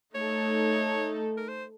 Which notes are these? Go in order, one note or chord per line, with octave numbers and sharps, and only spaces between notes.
A3 D#4 A4 C#5
A#4
C5